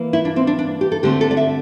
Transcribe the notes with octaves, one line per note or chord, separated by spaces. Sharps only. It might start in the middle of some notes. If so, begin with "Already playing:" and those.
Already playing: E3 A#3
E4
D4
C4
D4
D4
G4
A4
D3 A3 C4 G4
A4
D5
E5